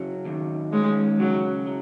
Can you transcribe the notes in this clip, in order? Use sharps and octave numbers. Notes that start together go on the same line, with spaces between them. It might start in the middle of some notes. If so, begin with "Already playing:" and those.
Already playing: C#3 F#3
D#2
G#3 C#4
C#3 F#3
F#3